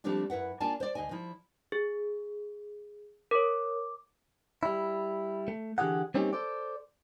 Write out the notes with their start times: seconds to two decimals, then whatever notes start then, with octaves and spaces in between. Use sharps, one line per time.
0.04 F3 G3 A3 C4 D4 F4
0.30 F#2 E4 B4 F#5
0.60 A#3 D4 F4 D5 G#5 A5
0.80 C5 D5
0.95 D2 D#5 G#5
1.11 F3 E4
1.72 G#4
3.31 A#4 C#5 D6
4.63 G3 E4
5.48 A3
5.78 D3 E3 F4 G4 G#4 F#5
6.14 G3 A#3 C4 C#4 D#4 G4
6.33 A4 C5 D5